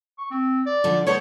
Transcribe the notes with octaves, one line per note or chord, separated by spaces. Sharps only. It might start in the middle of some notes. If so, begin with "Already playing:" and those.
C#6
C4
D5
D3 F3
B3 A4 C5 C#5